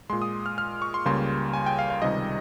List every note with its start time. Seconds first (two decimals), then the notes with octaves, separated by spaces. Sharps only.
0.10 A#2 G#3 C6
0.22 D#6
0.46 F6
0.58 F6
0.82 C#6
0.94 C6
1.05 C#2 C#3 G3 A#3 C6
1.53 G#5
1.66 G5
1.79 F5
1.90 F5
2.02 C#2 C3 D#3 G3 D#5